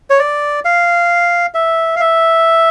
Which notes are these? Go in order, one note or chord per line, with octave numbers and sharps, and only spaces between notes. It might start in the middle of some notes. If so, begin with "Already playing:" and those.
C#5
D5
F5
E5
F5
E5